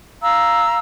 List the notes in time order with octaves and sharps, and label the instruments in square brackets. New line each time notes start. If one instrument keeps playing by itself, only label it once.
[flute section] F5 A#5 E6